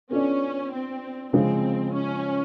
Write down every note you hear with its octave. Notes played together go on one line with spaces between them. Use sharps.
B3 C#4 D4 F4 A4 D5
C4
C#3 F3 G#3 C4
C#4